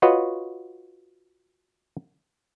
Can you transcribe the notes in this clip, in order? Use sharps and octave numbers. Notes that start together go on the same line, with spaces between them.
F4 F#4 B4 C#5 D#5 F#5